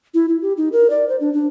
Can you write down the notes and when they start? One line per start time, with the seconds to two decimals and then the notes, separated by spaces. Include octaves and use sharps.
0.14 E4
0.29 E4
0.42 G4
0.57 D#4
0.72 A#4
0.90 D5
1.09 C5
1.21 D4
1.33 D4